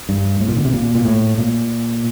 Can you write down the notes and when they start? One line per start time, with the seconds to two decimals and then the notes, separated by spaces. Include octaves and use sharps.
0.09 G2
0.40 A2
0.48 A#2
0.57 D3
0.65 C3
0.73 A#2
0.95 A#2
1.05 A2
1.38 A#2